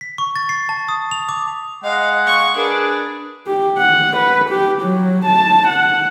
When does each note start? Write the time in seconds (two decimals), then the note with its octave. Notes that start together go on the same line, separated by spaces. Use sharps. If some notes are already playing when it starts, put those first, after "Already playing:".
0.01 B6
0.18 C#6
0.36 A6
0.49 C7
0.69 A5
0.89 D#6
1.11 F7
1.29 D6
1.84 G#3 D#5 F5 F#5
2.27 F5 C#6
2.56 D4 G#4 A#4 B4
3.47 G4
3.78 F#5
4.17 B4
4.50 G4
4.82 F#3
5.26 A5
5.68 F#5